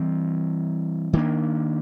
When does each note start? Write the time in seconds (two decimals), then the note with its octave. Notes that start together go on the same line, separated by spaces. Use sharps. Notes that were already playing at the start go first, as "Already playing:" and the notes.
Already playing: E3 G3 C4
1.13 D#3 F#3 A#3 D4